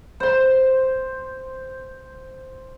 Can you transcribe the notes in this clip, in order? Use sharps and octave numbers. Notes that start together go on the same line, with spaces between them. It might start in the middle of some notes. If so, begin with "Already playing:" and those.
C5 C6